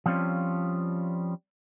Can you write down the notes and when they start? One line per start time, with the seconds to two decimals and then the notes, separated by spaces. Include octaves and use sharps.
0.06 F3 G3 C4 C#4 F4